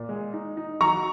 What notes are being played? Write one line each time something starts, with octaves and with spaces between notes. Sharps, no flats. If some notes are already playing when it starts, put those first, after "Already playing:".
Already playing: A#2
G#3
D#4
D#4
F#3 A#5 C#6